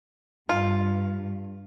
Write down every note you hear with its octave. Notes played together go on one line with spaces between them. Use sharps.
G2 F4